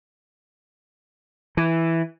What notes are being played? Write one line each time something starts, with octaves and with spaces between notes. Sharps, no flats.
E3